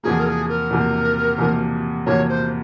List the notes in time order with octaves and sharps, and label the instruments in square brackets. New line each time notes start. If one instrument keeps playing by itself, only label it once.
[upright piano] E2 C3 F3 A#3 [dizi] G#4
[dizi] A#4
G#4
A#4
[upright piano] E2 C3 F3 A#3
E2 C3 F3 A#3
[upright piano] E2 C3 F3 A#3 [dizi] C#5
[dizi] C5